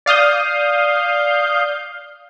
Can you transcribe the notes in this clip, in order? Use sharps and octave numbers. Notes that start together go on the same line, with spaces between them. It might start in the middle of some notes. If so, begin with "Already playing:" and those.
D5 F5 D#6 G6